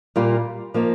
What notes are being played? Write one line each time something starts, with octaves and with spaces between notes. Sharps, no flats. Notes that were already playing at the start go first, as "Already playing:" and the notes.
A#2 G3 A#3 F4
F3 A#3 D#4